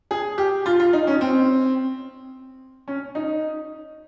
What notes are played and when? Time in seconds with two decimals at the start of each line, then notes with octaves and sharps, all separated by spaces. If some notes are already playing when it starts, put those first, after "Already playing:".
0.11 G#4
0.38 G4
0.66 F4
0.80 F4
0.93 D#4
1.07 C#4
1.21 C4
2.88 C#4
3.15 D#4